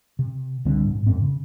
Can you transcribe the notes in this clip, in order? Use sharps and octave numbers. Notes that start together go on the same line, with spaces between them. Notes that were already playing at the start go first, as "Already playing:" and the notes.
C3
C#2 D3 G3 C4
A1 G#2
F2 G#2 C4
C#3